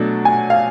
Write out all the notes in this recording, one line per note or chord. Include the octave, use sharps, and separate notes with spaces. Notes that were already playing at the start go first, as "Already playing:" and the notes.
Already playing: B2 F#3 A3 D4
G#5
F5